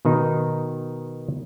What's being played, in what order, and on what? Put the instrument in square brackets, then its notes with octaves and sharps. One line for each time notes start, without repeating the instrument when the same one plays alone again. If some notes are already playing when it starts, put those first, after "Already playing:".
[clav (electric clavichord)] B2 D#3 D#4